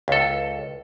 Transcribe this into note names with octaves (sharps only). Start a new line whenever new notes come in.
C#2 A4